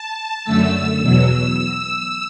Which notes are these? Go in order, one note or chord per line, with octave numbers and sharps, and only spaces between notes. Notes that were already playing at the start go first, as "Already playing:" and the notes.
Already playing: A5
F#2 D3 A3 E6
E2 B2 F#3 E6